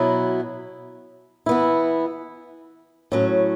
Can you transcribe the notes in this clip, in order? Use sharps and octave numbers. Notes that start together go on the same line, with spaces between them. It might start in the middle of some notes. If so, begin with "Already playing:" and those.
Already playing: B2 F#3 B3 E4
E3 B3 E4
A2 F#3 C#4